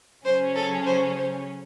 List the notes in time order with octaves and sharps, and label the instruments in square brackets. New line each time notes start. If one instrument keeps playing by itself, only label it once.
[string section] C#3 F#3 C#4 [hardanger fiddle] C5
[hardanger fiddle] A4
C5
C5